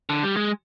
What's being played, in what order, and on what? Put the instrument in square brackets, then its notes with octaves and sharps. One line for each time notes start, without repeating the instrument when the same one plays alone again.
[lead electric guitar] D3
G3
G#3